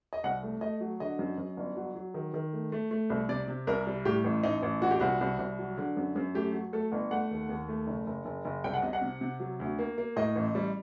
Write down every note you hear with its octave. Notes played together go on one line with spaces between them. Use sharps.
D#5
C2 F#5
A3
A3 D#5
F#3
D3 D#5
F#2
F#2
G1
F#3
F#3
D#3
D#3
A3
A3
A3
C2
C3 D5
C3
C2 A#4
G3
A2 G4
A1
A1 D#4
A1
A#2 F#4
G4
C2 F#4
C2
C2
F#3
D3
F#2
F#2
A3 G4
F#3
A3 A4
G1
A3 F#5
D#2
D#2
A3
F#1
F#1
F#1
F#1
C2 G5
F#5
C3 D#5
F#5
C3
C3
F#3
D2
A#3
A#3
A2 D#5
A1
G3